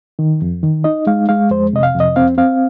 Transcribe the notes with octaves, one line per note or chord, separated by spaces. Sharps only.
D#3
F2
D#3
D#4 D#5
G#3 F5
G#3 F5
F2 C5
C3 D#5
F5
F2
D#5
C4 F5
C4 F5